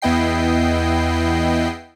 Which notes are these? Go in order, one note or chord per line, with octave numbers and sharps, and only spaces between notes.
E2 B3 E4 D#5 G5 C7